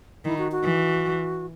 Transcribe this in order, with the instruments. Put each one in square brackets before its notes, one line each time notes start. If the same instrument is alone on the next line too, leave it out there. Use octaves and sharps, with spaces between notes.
[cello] D#3 [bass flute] E4
[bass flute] F#4
F#4
[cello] E3